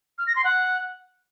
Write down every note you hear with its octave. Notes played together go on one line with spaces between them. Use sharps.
F6
A#6
C6
F#5